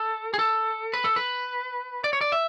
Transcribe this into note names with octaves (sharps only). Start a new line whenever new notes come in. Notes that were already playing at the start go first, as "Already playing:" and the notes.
Already playing: A4
G#4
A4
B4
A4
B4
D5
C#5
D5
E5